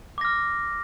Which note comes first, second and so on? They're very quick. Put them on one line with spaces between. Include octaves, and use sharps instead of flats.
D6 A#6 F6